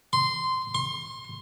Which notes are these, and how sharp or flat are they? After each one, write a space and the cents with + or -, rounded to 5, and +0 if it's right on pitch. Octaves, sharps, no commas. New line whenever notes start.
C6 -15
C6 +30